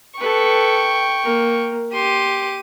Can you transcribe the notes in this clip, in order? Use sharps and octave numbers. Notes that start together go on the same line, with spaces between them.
A4 B4 G5 C#6
A#3 A#4
G4 C6 D#7